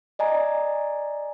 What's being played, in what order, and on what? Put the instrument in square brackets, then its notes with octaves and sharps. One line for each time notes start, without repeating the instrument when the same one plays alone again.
[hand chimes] D5 D#5 G#5 A#5